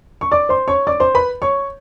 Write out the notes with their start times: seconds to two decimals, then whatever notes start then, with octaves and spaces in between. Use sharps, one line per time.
0.21 C#6
0.31 D5 D6
0.49 C5 C6
0.68 C#5 C#6
0.87 D5 D6
1.00 C5 C6
1.15 B4 B5
1.42 C#5 C#6